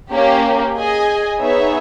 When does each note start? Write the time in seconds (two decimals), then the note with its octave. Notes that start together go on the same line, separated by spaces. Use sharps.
0.10 A#3 C#4 G4
0.75 G#4 D#5 G#5
1.39 B3 D#4 G#4 C#5 E5